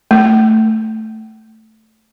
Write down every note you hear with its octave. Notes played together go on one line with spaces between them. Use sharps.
A3